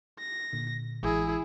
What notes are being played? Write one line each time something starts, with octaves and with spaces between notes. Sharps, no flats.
A#6
A#2 D3
A1 E3 G#3 E4 G#4